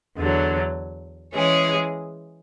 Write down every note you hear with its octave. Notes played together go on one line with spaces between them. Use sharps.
E2 D3 F#3
E3 G#3 C#4 G#4